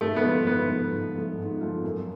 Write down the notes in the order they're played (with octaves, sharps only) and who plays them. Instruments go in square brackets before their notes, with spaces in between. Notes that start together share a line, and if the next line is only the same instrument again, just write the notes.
[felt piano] G#2 [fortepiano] A3
[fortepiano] B3
[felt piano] F3 A3 F4 A4
[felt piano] G#2 [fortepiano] B3
[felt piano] F3 A3 F4 A4
G#2
F3 A3 F4 A4
G#2
F3 A3 F4 A4
F#2